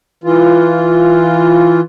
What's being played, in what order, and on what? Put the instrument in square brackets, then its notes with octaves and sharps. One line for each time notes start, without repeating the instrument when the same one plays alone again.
[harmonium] E3 F4